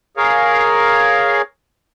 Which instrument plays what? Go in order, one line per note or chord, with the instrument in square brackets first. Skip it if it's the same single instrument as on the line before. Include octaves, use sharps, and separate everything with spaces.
[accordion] G#4 A#4 C#5 F5